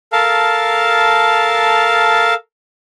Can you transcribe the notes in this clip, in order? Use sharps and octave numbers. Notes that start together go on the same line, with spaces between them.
A4 A#4 F5 A5